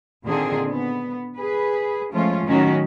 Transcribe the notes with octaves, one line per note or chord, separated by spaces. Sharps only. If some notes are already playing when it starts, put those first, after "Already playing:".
A#2 D3 D#3 C4 D4 G#4
B3
G#4 B4
F3 G#3 A3 C#4 F4
A2 D#3 F#3 C#4 F#4